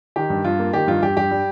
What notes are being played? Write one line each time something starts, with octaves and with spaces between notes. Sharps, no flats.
D#3 G4
G2
G2 F4
A#3
D#3 G4
G2 F4
G2 G4
G2 G4
G3